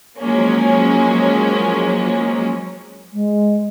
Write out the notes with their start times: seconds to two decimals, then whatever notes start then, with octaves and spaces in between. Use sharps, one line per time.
0.19 F3 F#3 G#3 A#3 C#4
3.13 G#3